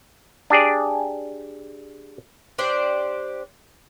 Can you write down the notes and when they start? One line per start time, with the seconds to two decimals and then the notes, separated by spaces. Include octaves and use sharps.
0.50 D4 G4 G#4 D5
2.59 D4 G4 C5 D5